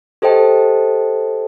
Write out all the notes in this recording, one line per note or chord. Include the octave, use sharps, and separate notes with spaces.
G4 A4 C5 D#5 G5 A5